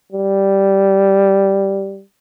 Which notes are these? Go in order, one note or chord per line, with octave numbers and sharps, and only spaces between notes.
G3